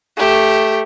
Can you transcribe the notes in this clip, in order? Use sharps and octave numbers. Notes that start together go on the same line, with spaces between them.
A3 G4